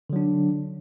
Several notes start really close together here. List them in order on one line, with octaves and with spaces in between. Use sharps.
D3 F#3 D4